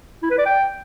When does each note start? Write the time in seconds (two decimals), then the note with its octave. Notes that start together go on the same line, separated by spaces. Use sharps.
0.23 E4
0.30 B4
0.38 D5
0.46 G5